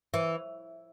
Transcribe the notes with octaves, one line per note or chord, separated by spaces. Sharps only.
E3